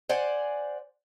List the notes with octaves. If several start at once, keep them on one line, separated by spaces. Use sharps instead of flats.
C5 D5 F#5 G#5